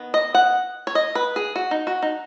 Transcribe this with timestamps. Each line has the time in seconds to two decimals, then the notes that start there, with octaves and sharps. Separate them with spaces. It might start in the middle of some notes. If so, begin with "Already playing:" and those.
Already playing: D#3 B3
0.14 D#5
0.34 F#5
0.87 C#5
0.95 D#5
1.15 B4
1.36 G#4
1.56 F#4
1.71 D#4
1.87 F#4
2.02 D#4